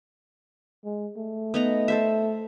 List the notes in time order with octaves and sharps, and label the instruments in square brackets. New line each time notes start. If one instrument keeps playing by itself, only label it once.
[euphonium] G#3
A3
[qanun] B3 D#4 A#5
A4 C5 E5